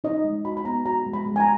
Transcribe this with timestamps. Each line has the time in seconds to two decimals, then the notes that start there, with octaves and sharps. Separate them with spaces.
0.04 D#4 D#5
0.24 G#3
0.45 F#4 B5
0.57 B5
0.65 B3 A#5
0.86 F#4 A#5
1.06 G#3
1.13 B5
1.26 G#3
1.36 G#5
1.40 A#5